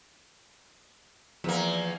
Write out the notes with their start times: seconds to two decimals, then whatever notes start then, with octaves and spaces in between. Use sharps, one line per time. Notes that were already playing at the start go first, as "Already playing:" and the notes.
1.44 E2 E3 F3 A#3